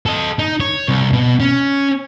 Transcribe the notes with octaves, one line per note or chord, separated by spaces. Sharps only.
A4 D#5
D#4
C#5
C2
B2
C#4